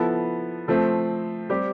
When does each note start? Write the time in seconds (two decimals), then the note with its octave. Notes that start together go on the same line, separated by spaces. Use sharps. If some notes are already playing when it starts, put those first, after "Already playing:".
Already playing: F3 B3 E4 A4
0.68 F3 A3 C4
1.50 G3 C4 G4